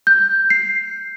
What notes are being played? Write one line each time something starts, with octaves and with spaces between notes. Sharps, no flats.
G6
C7